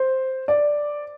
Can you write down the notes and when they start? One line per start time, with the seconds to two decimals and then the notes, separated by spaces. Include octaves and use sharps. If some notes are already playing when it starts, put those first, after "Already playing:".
Already playing: C5
0.48 D5